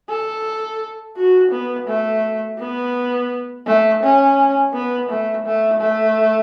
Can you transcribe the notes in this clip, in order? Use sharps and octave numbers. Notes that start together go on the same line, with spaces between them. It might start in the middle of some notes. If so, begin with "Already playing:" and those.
A4
F#4
B3
A3
B3
A3
C#4
B3
A3
A3
A3